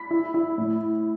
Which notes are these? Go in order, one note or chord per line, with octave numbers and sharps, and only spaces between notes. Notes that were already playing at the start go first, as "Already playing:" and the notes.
Already playing: B5 B6
E4
E4
A2